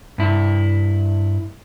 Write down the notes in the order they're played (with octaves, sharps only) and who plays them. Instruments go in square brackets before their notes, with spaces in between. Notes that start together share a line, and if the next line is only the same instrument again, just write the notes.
[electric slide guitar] G2 E4